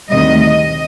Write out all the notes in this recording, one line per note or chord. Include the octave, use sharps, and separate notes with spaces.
D2 C3 D#3 G3 D#5
D#5